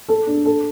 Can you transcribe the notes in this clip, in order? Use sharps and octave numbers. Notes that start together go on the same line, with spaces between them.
A4
D4
A4